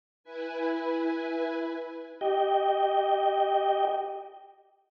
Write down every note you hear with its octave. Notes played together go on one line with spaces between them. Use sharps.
E4 B4 G#5
G4 D#5 G5